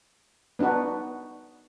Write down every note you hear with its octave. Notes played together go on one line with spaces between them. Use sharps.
B3 D4 D#4 F#4 B4